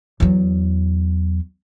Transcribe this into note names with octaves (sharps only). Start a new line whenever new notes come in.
E2 F#3